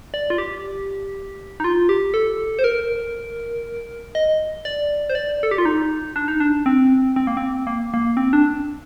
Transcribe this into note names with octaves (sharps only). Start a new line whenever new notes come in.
D5
F4
G4
D#4
F4
G4
A4
C5
A#4
D#5
D5
C5
D5
A4
G4
F4
D#4
D4
D#4
D4
C4
C4
A#3
C4
A#3
A#3
C4
D4